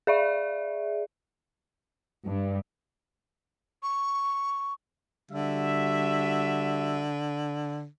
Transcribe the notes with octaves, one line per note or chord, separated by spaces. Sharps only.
G#4 D5 E5
G2
C#6
D3 G3 F#4 E5